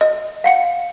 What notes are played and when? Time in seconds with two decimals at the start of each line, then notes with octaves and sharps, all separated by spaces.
0.01 D#5
0.44 F5 F#5 C#7